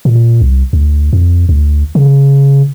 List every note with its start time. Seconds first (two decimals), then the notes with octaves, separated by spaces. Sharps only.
0.05 A#2
0.41 C2
0.73 D2
1.13 F2
1.49 D2
1.95 C#3